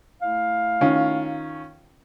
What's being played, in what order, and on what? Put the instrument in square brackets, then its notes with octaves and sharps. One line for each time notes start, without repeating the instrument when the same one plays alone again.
[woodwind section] A3 E4 F5
[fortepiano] D#3 C#4 F4